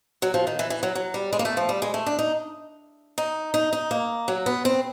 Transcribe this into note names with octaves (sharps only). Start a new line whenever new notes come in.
F#3
F3
D#3
E3
E3
F#3
F#3
G3
G#3
A#3
A3
F3
G3
G#3
A3
D4
D#4
D#4
D#4
D#4
A#3
F#3
B3
C4